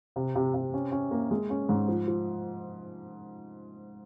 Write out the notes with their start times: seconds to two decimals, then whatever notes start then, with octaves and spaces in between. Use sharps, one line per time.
0.16 C3
0.35 C3
0.54 C3
0.74 C#4
0.92 C#4
1.11 A#3
1.31 G#3
1.50 C#4
1.69 G#2
1.88 F3
2.08 F3